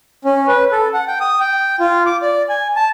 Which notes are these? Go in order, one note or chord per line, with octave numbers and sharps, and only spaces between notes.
C#4
B4
A4
F#5
G5
D#6
G5
F4
D6
D5
G#5
A5